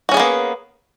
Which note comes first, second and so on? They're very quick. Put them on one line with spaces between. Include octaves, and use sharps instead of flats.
F#4 C#4 G#4 B3 A#3